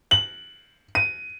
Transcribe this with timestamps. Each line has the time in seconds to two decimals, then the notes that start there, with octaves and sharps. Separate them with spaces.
0.11 F#7
0.95 D#7